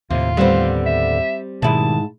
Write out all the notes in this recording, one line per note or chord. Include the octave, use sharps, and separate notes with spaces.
D#2 A2 C3 F4
D3 G3 B3 C4 C5
E5
G#2 B2 D#3 E4 A5